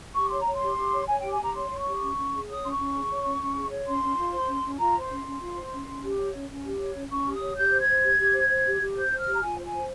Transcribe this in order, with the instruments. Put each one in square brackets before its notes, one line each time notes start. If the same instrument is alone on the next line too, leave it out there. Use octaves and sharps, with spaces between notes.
[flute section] G4 C#6
C#5 C6
A#5
C#5
C6
G4
G4
C#5
C#5 G#5
G4 G5
G#5
G4 A#5
C#5 C6
C#5
C#6
G4
C#4
C#4
G#4
C#5 D#6
C#4 C6
C#6
C#4
G#4
C#5
C#4
C#4
G#4
C#5
C#4 C6
C#4
F4
C5
C#4
C#4
F4 A#5
C5
C6
C#4
C#4
F4
C5
C#4
C#4
G4
C#5
C#4
C#4
G4
C#5
C#4
C#4 C#6
G4
D#6
C#5
G4 G6
C5
G#6
C5
G4
G4
C5
C5
G4
G4
C5 G6
C5
F6
G4
A#5
F4 G#5
C5
G#5
C5